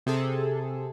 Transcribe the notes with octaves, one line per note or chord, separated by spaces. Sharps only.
C3 G#4 A4